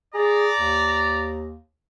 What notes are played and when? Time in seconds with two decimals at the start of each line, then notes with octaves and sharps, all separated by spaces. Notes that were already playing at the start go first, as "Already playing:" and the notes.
0.15 G#4 D5 A#5
0.57 D#2